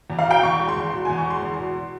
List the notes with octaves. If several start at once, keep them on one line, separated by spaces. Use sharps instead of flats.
E2
F5
B2 G5
E2 C#6
G#3
C6
E2
B2
E2 G#5
C#6
G#3 C6
E2
B2